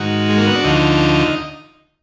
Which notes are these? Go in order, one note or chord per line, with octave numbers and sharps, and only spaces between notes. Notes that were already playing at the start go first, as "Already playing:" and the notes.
Already playing: G#2 D#3 F#4
G#3
A#3
B3
D4
D2 D3 F3 D#4